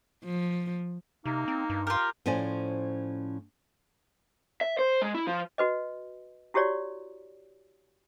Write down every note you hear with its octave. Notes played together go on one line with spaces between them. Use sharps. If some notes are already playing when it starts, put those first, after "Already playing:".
F3
C3 A#3 D#4
C4
G2
F4 G4 A#4
A2 F3 C#4 C5 D5 G#5
E5
C5
G#3
E4
F3
F#4 B4 D#5
E4 F#4 G4 C#5 D5